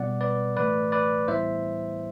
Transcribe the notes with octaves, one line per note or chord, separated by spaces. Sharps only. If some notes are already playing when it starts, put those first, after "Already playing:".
Already playing: B2 G3 B3 D5 F#5
B4 D5
A2 E3 A3 B4 D5
B4 D5
A2 E3 G3 B3 E4 C5 E5